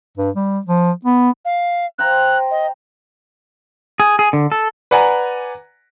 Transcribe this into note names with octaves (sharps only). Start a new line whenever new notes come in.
G2
G3
F3
B3
F5
C5 G5 A#5 F#6
D#5
G#4
G#4
D3
A4
B4 D5 F#5 G#5 A#5